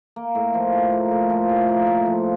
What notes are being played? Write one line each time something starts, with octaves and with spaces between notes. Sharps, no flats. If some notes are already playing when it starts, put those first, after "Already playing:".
A#3
A2
F3
A2
A#3
A2
F3
A2
A#3
A2
F3